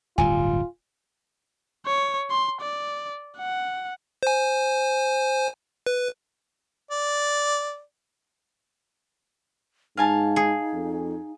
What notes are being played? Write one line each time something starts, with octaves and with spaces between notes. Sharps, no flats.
D1 G1 G3 F4 G#5
C#5
C6
D5
F#5
C5 G#5
B4
D5
G#2 D#4 F5 G#5 A5
G#4
F2